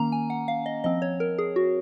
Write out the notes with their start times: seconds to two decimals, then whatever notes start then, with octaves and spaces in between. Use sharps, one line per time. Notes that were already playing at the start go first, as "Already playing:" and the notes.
Already playing: D#3 A#3 C#4 A#5
0.12 G#5
0.30 F#5
0.48 F5
0.66 D#5
0.84 F3 C4 D#5
1.02 C#5
1.20 A#4
1.38 G#4
1.56 F#4